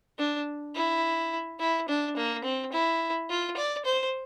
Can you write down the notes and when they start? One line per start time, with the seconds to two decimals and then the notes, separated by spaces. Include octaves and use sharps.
0.19 D4
0.76 E4
1.60 E4
1.89 D4
2.17 A#3
2.44 C4
2.72 E4
3.30 F4
3.57 D5
3.85 C5